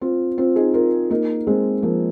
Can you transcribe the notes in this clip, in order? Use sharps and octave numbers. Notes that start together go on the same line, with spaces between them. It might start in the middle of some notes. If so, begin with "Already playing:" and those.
C4 F4
C4 F4
D#4 G#4
F4 A#4
A#3 D#4
G#3 C4
F3 A#3